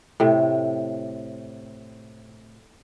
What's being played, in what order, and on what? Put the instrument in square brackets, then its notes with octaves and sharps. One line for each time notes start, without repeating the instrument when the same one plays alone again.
[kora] A2 C3